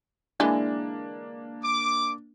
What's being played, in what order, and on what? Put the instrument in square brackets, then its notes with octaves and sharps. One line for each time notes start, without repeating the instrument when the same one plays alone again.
[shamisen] D3 E3 G#3 [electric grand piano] A#3 D4
[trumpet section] D6